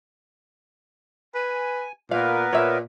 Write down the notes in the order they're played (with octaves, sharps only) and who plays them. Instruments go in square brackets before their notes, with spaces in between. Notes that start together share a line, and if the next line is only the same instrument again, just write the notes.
[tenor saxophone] B4 [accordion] G#5
[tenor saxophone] A#2 [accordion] B3 A#4 B4 [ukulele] F5
[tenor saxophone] A#2 [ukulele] C#5 E5